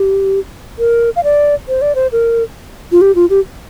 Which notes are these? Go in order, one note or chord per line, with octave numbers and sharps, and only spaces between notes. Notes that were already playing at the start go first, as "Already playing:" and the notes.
Already playing: G4
A#4
F5
D5
C5
D5
C5
A#4
F4
G4
F4
G4